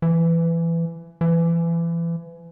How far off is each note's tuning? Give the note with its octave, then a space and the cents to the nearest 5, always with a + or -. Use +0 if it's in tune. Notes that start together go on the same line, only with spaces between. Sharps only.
E3 +20
E3 +30